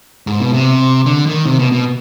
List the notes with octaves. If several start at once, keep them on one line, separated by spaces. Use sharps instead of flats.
G#2
B2
C3
D3
D#3
C3
B2
B2